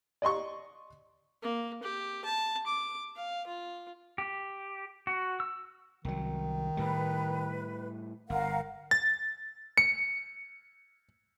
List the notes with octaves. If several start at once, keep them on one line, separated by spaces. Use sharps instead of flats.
D5 D#5 C6 C#6
A#3
G4
A5
D6
F5
F4
G4
F#4
E6
C2 D#3 F#3
A2 G3 B4
G1 A#4 F5 F#5
A6
C#7